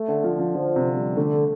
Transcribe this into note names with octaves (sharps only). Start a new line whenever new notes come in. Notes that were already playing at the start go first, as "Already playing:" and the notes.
Already playing: A3
D3
F3
F3
D3 F3
C3
G3
D3 A3